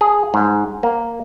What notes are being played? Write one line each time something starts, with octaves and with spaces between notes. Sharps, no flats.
G#4
G#2
A#3